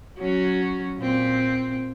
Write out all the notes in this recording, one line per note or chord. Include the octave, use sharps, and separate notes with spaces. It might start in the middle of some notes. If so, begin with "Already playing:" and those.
F#3 C#4 F#4
A#2 C4